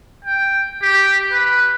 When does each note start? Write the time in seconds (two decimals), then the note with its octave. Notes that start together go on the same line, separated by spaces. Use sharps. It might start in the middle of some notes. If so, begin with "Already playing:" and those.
0.25 G5
0.83 G4
1.32 B4